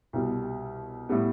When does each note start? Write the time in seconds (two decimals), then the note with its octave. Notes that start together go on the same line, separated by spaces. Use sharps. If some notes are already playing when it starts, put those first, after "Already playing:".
0.13 C2 B2 G3
1.09 A2 G3 B3